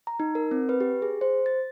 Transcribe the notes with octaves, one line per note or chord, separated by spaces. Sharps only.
A#5
D#4
A#4
C4
B4
G4
G#4
C5
A6